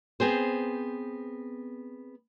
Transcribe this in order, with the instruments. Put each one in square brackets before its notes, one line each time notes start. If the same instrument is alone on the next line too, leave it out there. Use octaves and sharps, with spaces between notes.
[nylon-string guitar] B3 C4 G#4 C5